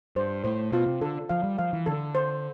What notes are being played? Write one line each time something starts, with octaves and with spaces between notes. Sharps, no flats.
G2 C5
A2 C5
B2 F4
C3
D3 A4
F3 F5
G3
F3 F5
E3
D3 A4
C5